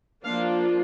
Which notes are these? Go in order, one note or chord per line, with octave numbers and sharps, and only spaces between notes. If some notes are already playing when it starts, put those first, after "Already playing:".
F3 A#3 D4 F4 F5